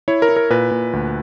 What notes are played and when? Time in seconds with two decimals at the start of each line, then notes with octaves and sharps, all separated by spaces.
0.08 E4 C#5
0.22 A#4
0.29 E4
0.36 A#4
0.50 A#2 B4
0.71 A#2
0.93 D2